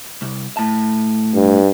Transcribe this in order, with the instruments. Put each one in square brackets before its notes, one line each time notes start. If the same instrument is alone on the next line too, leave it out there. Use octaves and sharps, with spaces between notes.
[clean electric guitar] C2
A2 A5
[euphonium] G2